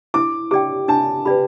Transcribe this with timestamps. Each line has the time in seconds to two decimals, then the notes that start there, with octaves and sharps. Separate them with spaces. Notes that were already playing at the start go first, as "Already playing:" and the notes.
0.14 E4 D6
0.51 G4 D5 G5 D6
0.88 D4 A5
1.25 G4 B4 D5 B5